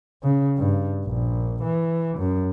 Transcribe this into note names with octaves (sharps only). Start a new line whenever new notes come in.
C#3
G2
A#1
E3
F#2